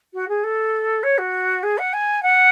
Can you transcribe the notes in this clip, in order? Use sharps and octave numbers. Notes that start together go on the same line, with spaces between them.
F#4
G#4
A4
C#5
F#4
G#4
F#5
G#5
F#5